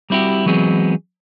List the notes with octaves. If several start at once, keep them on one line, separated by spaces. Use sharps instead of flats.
G3 C4 E4 F#4 G4
E3 F#3 G#3 B3 C4 G#4